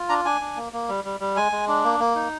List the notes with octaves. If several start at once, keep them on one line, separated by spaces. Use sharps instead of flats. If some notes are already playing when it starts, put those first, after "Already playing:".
Already playing: F4
D4 A#5
D4 G#5
D4
A#3
A#3
G3
G3
G3
G#3 G#5
G#3
D4
A#3
A#3
D#4